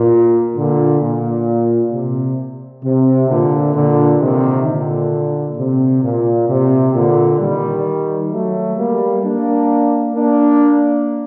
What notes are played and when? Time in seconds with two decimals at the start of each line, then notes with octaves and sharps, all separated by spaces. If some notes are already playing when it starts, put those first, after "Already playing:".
Already playing: A#2
0.55 A#2 D3
1.01 A#2
1.92 C3
2.84 C3
3.29 A#2 D3
3.75 A#2 D3
4.21 C3 D#3
4.66 A#2 D3
5.58 C3
6.03 A#2
6.49 C3
6.95 A#2 D3
7.40 D#3 G3
8.32 F#3 A3
8.77 G3 A#3
9.23 A#3 D4
10.14 A#3 D4